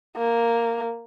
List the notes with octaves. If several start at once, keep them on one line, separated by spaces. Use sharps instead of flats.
A#3